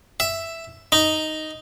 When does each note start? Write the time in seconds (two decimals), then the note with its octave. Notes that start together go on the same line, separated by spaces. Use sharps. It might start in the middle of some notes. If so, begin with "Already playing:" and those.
0.20 E5
0.92 D#4